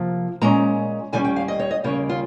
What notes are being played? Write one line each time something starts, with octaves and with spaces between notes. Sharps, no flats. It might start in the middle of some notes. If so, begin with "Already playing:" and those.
Already playing: C3 F3 A#3
A#2 G#3 C#4 A#5
D#2 C#3 G3 A#3 C#4 G#5
G5
F5
D#5
C#5
D#5
D#2 C#3 G3 A#3 C#5
F4